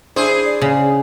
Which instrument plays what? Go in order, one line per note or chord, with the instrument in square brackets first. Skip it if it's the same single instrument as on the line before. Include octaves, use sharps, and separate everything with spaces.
[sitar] D4 G#4 C5 [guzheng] E4
[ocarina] D5
[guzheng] C#3